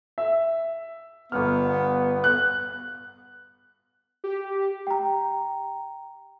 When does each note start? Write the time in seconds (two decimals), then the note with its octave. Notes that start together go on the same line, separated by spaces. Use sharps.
0.18 E5
1.32 G1 B3 F6
2.24 F#6
4.24 G4
4.87 G5 A#5